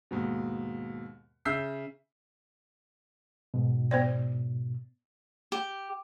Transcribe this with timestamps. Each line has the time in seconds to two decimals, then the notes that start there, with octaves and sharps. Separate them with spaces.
0.11 D#2 G#2 B2
1.45 C#3 E5 E6 G6 B6 C7
3.54 G#2 B2
3.91 B3 C5 D5
5.52 G4